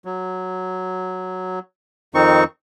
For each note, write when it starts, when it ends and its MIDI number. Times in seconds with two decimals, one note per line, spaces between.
0.05 1.59 54
2.15 2.44 41
2.15 2.44 51
2.15 2.44 60
2.15 2.44 63
2.15 2.44 85